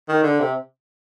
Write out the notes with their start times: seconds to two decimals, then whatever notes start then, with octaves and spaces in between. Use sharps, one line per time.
0.09 D#3
0.23 D3
0.40 C3